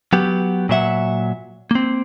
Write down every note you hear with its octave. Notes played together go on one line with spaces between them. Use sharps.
F#3 B3 G4
A#2 F#3 E5 F#5
A#3 C4